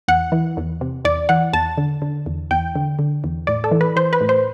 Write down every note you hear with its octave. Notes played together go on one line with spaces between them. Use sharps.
E2 F#5
E3
E2
C3
E2 D5
E3 F#5
E2 A5
D3
D3
E2
E2 G5
D3
D3
E2
A2 D5
A4
E3
B4
E3 C5
B4
A2
C5